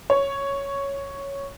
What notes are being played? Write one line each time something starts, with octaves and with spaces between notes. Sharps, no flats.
C#5